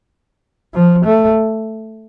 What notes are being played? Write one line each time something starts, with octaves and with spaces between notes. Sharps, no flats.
F3
A3